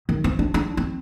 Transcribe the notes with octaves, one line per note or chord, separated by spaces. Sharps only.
D#3
C4
D4
D4
C4